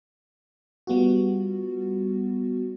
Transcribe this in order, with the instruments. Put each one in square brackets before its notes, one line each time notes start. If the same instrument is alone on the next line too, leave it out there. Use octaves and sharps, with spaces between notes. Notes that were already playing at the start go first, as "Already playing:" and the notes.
[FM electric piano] G3 B3 F4 F#4